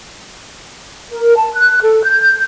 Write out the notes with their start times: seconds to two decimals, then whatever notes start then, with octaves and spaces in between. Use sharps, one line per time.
1.10 A#4
1.36 A5
1.54 F#6
1.81 A4
2.04 G6